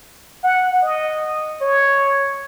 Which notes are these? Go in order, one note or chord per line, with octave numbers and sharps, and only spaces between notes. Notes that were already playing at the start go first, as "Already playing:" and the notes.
F#5
D#5
C#5